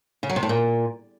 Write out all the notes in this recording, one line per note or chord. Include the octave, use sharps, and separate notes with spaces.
C#3
F#3
C3
A2
A#2